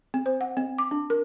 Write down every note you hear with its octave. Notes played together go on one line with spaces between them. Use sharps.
C4
C5
F#5
C4
D6
D4
A#4